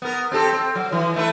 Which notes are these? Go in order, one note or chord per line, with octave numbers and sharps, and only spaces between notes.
B3 A#4
C4 G4 A4
C4
F#3
E3
E3 A3 B4